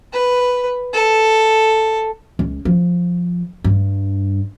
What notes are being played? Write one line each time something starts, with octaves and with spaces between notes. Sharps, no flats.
B4
A4
C#2
F3
G2